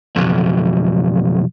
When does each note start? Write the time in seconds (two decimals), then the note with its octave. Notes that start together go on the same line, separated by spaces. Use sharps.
0.16 B1 F2